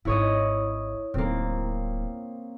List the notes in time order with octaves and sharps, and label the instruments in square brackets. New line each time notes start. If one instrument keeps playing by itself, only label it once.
[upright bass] G#1 [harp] E4 C#5 D#5
[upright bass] D1 [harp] A#3 C4